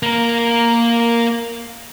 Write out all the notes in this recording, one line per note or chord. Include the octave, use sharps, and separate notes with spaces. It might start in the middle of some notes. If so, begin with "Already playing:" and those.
A#3 A#4